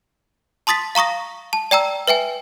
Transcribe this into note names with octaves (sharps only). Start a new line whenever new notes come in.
A5 C6 D#6 A6 B6
F5 A#5 C#6 D#6 A#6
A5
D5 G5 A#5 E6
B4 E5 G5 G#5